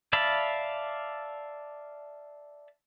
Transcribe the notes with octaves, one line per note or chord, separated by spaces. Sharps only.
D5 E5 F5 A5 B5